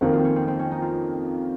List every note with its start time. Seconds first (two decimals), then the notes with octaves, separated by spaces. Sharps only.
0.01 F2 D#3 A#3 F#4
0.13 F4
0.19 C4
0.25 C#4
0.36 C4
0.48 C4
0.59 C#4
0.71 D#4
0.82 F4